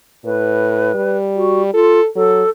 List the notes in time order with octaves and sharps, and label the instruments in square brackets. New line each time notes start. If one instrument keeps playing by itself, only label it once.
[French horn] A2 [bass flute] B4
[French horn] G3
[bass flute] F#4
[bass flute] F4 [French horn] A4
[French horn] F#3 [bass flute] A4